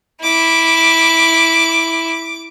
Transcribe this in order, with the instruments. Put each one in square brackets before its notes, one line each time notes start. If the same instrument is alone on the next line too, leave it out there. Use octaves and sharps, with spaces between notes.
[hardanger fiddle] E4 [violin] D6